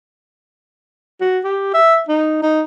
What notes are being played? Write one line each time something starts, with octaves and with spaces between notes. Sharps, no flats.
F#4
G4
E5
D#4
D#4